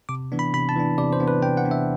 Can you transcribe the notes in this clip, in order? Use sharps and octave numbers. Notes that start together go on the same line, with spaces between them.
C3 D6
E3 B3 D4
B5
C3 B5
A5
E3 B3 D4
C3 D5
C5
E3 B3 D4
B4
C3 G5
F#5
E3 B3 D4
E5